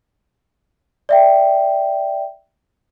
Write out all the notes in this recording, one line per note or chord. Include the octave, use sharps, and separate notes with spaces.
D5 E5 G5